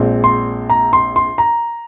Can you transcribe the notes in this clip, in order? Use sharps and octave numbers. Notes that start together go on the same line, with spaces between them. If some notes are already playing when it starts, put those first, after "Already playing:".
Already playing: A#1 A#2 G#3 C4
C6
A#5
C6
C6
A#5